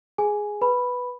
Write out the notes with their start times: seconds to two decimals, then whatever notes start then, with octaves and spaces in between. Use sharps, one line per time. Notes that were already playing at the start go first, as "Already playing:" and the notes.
0.18 G#4 G#5
0.61 B4 B5